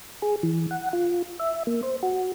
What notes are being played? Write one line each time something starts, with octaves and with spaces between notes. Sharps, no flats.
G#4
E3
F#5
F4
E5
A#3
C5
F#4